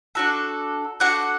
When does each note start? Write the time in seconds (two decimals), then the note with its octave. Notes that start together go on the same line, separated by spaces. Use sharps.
0.15 D4 F#4 A4
1.00 D4 F#4 A4 F#5